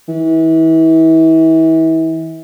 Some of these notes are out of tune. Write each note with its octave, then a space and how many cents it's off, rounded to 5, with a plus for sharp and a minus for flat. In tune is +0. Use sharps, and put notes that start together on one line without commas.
E3 -35